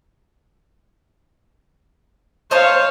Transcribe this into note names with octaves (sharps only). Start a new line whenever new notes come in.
C5 C#5 D#5 F5 A5